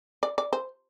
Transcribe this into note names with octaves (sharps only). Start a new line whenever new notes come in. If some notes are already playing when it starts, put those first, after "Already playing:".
D5
D5
C5